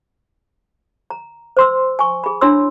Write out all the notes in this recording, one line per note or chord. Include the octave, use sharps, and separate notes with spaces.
A#5
C5 C6 E6
G#5 C#6
G#4 B5
D4 E4 C#5 C6 E6